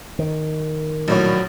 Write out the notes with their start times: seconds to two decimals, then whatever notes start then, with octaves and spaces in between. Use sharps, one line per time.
0.19 D#3
1.08 A#1 A2 F#3 C#5